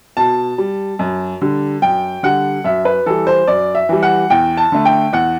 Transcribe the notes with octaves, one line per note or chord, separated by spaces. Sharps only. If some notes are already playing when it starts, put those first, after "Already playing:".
B2 A5
G3
F#2
D3 G3
F#2 G5
D3 G3 F#5
F#2 E5
B4
E3 G3 A4
C5
F#2 D5
E5
E3 G3
F#5
E2 G5
A5
D3 A3
G5
E2 F#5